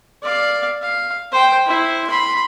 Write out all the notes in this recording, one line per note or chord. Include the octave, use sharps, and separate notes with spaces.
D5 F5
F5
C5 G5
E4 C5
B5 C6